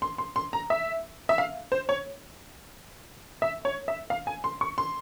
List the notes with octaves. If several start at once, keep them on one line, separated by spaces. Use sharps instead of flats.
C6
C6
C6
A#5
E5
E5
F5
C5
C#5
E5
C#5
E5
F5
G#5
C6
C#6
C6